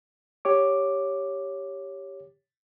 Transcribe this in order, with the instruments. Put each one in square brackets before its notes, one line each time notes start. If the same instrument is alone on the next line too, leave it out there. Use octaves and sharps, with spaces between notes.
[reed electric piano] G4 C#5 D6